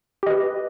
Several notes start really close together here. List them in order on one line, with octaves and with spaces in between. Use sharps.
G4 D#5 B4